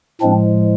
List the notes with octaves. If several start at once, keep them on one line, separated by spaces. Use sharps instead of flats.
A2 F3 G#3 C4 D4